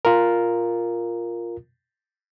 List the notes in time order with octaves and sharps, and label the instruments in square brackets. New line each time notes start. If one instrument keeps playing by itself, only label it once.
[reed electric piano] F4 A#4